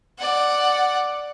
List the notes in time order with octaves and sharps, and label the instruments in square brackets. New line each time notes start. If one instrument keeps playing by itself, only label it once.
[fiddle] D5 F#5